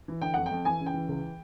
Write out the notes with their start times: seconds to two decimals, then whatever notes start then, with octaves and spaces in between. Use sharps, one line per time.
0.08 E3
0.21 D3 G5
0.34 F2 F#5
0.46 G5
0.51 F2
0.65 E3 G#5
0.80 C#3
0.86 G5
0.94 E3
1.08 C#2